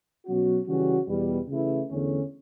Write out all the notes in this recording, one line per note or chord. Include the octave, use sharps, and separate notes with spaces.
B2 F#3 C#4 F#4
C#3 E3 G3 C#4 F#4
E2 B2 G3
C#3 E3 A3 E4
E2 D3 A3 C#4